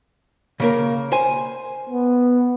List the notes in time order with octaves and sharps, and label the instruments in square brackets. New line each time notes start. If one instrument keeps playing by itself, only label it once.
[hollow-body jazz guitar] C#3 A#3 A#4
C5 G#5
[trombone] B3